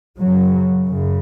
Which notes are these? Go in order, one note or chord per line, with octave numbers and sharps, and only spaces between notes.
F#2 C#3 F#3
F#2 C#3